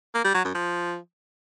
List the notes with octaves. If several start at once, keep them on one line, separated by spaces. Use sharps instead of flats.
A#3
G3
F#3
F#2
F3